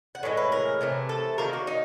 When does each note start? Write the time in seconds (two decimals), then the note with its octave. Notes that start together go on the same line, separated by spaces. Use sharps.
0.15 F#5
0.23 A2 E3 G#3
0.37 B4
0.52 A#4
0.81 C3 E3 A3
1.09 A4
1.38 D#3 F#3 A#3 A#4
1.53 F#4
1.67 D#4